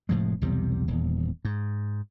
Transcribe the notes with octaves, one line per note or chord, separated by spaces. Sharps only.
F1 A2 F3 G#3
B1 E2 C3 G3
D#1 E2
G#2